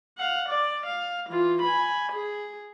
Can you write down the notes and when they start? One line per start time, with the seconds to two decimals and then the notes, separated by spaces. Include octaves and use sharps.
0.18 F5 F#5
0.49 D5
0.86 F5
1.30 E3 F4
1.61 G#5 B5
2.13 G#4